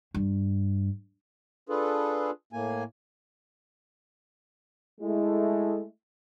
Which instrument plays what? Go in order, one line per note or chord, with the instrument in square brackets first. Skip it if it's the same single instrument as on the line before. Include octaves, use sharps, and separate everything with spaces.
[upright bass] G2
[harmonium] D4 F4 G#4 A4 B4
A2 A#3 G#5
[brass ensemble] G#3 A3 E4